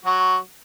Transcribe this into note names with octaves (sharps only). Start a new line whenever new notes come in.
F#3 F#4